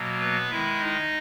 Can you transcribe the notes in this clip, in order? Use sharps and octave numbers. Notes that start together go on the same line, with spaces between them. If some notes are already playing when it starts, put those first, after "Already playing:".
Already playing: B2 F#3 A#3
B3 B4
D#3 G#3 E4 E5
D#4 D#5